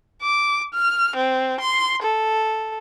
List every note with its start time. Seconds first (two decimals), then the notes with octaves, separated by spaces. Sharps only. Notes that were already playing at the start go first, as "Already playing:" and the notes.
0.22 D6
0.73 F6
1.16 C4
1.60 C6
2.02 A4